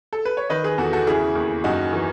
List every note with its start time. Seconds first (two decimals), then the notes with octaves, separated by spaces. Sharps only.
0.13 A4
0.25 B4
0.37 C#5
0.50 D#3 B4 D#5
0.64 G#4 B4
0.78 E2 F#4 A4
0.93 F#4 A4
1.07 C#3 E4 G#4
1.35 D#2
1.64 F#2 D#4 F#4
1.93 E3